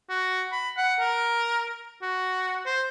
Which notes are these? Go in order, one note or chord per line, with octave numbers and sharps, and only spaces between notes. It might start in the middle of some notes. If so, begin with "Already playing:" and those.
F#4
B5
F#5
A#4
F#4
C5